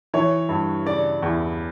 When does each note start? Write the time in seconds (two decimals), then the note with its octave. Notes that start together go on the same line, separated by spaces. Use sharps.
0.14 E3 C#5
0.49 G2
0.86 C#3 D5
1.22 E2